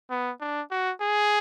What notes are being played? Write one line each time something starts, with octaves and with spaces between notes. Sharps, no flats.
B3
D4
F#4
G#4